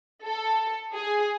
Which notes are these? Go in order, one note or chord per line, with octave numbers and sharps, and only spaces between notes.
A4
G#4